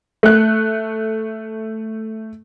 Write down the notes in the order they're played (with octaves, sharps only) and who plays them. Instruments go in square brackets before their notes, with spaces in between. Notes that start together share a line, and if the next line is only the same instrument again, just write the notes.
[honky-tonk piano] A3 F#6